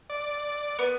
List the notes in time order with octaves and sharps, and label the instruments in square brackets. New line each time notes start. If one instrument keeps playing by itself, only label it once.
[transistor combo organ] D5
[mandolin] B3